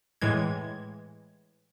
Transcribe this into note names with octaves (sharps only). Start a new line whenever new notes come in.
A2 E3 G#3 G#6